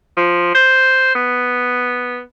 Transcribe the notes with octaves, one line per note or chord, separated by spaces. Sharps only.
F3
C5
B3